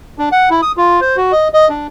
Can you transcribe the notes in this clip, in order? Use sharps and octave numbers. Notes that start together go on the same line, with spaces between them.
D4
F#5
E4
D#6
F4
C5
F#4
D#5
D#5
D4